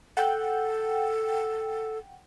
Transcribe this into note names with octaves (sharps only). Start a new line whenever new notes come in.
A4 F#5 G5